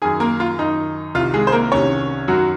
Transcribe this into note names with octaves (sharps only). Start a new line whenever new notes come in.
F#2 D#3 G#4 G#5
A#3 A#4
F4
F#2 D#3 D#4
C2 C3 D#3 F4
G#3 G#4
C5
A#3 A#4
C2 C3 D#3 C#4 C#5
F#2 D#3 F#3 F#4